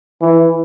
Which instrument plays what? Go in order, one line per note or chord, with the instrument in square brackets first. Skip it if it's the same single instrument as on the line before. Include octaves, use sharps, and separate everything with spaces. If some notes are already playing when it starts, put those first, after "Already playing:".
[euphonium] E3